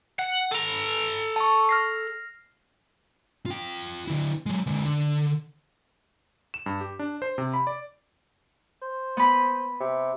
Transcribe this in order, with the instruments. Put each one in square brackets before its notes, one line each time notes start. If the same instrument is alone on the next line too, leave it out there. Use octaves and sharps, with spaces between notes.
[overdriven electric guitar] F#5
A4 A#5
[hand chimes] A5 C#6
F6 A#6 C7
[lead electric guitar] F4 G5
D3 E4
F#3 G#3
D3 G#3
D3
[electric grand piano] E7
G2
G4
D4
C5
C3
B5
D5
[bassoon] C5
[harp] B3 B5
[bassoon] C3